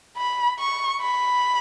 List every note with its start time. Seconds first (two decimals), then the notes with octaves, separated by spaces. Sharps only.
0.17 B5
0.59 C#6
1.01 B5